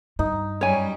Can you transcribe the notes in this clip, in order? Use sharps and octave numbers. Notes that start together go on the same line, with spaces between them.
G2 D#4
F#2 G3 C#5 G#5